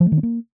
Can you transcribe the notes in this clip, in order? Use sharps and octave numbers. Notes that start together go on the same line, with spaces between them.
F3
A3
D#3
C4
A#3